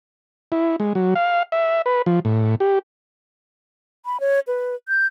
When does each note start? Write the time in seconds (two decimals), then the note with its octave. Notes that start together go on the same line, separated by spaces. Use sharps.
0.52 E4
0.80 G#3
0.95 F#3
1.15 F5
1.52 E5
1.86 B4
2.06 F3
2.25 A2
2.60 G4
4.06 B5
4.20 C#5
4.47 B4
4.88 G6